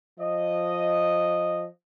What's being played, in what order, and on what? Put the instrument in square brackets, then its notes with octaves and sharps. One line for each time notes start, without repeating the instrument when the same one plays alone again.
[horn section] F3 D#5